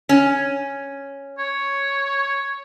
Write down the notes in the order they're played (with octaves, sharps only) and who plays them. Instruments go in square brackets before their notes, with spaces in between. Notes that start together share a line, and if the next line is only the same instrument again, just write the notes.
[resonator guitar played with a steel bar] C#4
[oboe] C#5